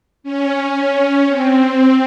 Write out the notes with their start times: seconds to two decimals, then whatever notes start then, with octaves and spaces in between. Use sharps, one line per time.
0.23 C#4
1.27 C4